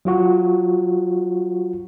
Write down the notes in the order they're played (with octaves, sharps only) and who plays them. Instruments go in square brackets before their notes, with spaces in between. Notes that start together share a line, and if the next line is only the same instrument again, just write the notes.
[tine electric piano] F#3 F4 F#4